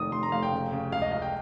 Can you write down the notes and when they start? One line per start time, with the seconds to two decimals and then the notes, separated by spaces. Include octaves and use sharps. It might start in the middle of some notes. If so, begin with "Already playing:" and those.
Already playing: F1 D#3 D#6
0.12 F1 C6
0.23 A#5
0.32 F1 F5
0.43 G5
0.52 C#3
0.72 C#3
0.92 C#2 F5
1.02 D#5
1.12 C#2 F5
1.22 G5